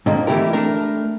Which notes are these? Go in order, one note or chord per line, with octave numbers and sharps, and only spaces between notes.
G#2 D3 D#3 F3 A#3
E3 A3 E4 G4 A#4
A3 D4 A#4